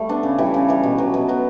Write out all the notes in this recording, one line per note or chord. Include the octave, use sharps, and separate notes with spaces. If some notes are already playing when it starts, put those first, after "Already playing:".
Already playing: G3 A3
B3 D4
C#3
E3 G3
C#3
E3 G3
B2
F#3 B3
B2
F#3 B3